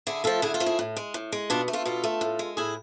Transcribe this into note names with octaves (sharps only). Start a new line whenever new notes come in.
D3 E4 G#4
F3 A3 F4 A4
D3 E4 G#4
F4 A4
F3 A3
E4 G#4
A2
G#3
A2
G#3
B2 D4 F4
A3
F4 A4
B2 F4 A4
A3
A2
G#3
A2 E4 G#4